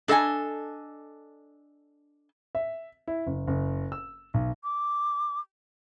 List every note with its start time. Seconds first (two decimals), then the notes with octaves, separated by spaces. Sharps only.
0.08 D4 A4 D#5 F5 G#5
2.55 E5
3.08 E4
3.26 F#1
3.47 F#1
3.92 E6
4.34 B1
4.64 D6